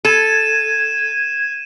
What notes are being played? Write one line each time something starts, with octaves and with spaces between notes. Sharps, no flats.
A4 G#6 D#7 E7